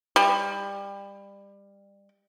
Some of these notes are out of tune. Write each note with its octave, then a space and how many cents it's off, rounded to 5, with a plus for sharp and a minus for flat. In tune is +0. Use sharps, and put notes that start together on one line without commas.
G3 +25